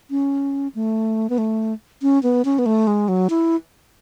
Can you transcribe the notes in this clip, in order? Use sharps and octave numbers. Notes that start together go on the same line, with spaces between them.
C#4
A3
B3
A3
C#4
B3
C#4
B3
A3
G#3
F#3
E4